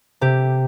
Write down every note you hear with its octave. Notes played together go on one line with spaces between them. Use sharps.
C3 G4